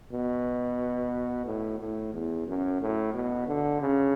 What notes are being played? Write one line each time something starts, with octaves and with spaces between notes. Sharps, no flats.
B2
A2
A2
E2
F#2
A2
B2
D3
C#3